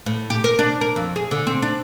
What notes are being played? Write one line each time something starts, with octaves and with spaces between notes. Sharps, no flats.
A2
G4
A#4
D4
A#4
F2
G#4
D3
C4
D4